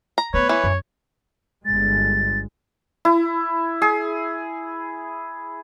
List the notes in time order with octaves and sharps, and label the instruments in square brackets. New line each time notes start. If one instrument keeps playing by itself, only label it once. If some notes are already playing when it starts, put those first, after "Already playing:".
[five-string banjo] A#5
[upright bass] A3 B3 [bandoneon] B4 [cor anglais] C#5
[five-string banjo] E3 [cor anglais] C#5
[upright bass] F#2
[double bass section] G1 G#3 [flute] A6
[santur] E4
G#4